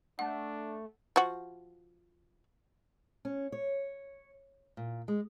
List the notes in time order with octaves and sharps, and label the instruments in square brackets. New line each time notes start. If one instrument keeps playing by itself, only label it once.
[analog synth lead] A3 [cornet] D4 [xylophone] F#5
[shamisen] F3 F#4
[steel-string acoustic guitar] C#4
C#5
A#2
G#3